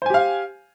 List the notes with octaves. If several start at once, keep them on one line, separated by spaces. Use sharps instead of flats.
G4 C5 F5 G#5